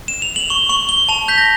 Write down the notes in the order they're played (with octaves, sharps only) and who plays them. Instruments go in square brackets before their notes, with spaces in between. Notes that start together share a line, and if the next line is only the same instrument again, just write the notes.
[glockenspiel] E7
F7
F#7
C#6 G7
C#6 F#7
C#6 G7
A5 F7
G6 B6
A#6